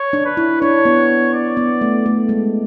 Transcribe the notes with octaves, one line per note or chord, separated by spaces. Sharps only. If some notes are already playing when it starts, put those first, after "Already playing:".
Already playing: C#5
D4
B4
E4
D4 C#5
B3
D5
B3
A3
A3
G#3